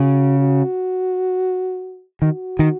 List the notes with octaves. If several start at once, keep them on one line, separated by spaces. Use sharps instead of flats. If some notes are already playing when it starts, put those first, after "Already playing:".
Already playing: C#3 F#4
F#4
D#3 F#4
D#3